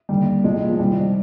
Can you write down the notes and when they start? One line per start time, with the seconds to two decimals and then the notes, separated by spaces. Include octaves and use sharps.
0.09 D#2 D3 G3
0.44 C2 A#2 G#3
0.69 F3
0.79 C2 C3 D#3 G3